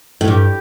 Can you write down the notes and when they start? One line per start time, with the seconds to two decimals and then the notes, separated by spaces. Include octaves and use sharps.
0.21 A2
0.28 G2 G4